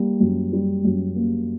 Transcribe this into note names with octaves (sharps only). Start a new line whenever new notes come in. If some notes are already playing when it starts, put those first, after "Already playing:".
Already playing: G3 A#3
F#2
G3
F#2
A#3